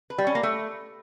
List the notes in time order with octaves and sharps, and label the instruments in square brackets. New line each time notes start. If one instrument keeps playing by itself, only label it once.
[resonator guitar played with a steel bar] B4
G3
C#4
A#3
A3